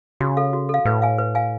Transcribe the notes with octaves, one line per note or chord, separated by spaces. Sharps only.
C#3 F#4
A4 F5
F#4
A4 F5
A2 B4
F5 G#5
B4
F5 G#5